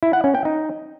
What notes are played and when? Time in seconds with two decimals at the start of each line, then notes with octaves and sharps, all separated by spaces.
0.03 E4
0.13 F#5
0.24 C#4
0.35 G5
0.45 D#4